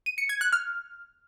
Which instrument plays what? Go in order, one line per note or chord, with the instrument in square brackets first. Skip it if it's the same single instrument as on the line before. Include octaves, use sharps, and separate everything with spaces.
[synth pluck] D#7
C#7
G#6
F#6
F6